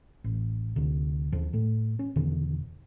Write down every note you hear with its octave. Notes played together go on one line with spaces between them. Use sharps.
A1
D2 C3
D#2 F3
A2 A3
C#4
E2 B2 D3 D#3